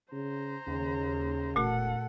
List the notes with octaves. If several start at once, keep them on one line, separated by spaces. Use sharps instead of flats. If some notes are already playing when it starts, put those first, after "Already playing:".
C#3 C5 A#5
D#2 C#3
E1 A#2 A3 F#4 A4 F#5